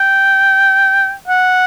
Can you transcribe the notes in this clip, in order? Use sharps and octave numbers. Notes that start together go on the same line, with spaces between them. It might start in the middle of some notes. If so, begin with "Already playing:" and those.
Already playing: G5
F#5